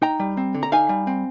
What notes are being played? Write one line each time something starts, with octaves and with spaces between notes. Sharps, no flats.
D#4 G5 A#5
G3
C4
D3
A#5
D#4 F5 G#5
G3
C4